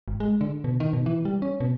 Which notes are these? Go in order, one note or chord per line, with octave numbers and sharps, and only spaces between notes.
G#1
G#3
D3
B2
D#3
B2
E3
G3
C#4
B2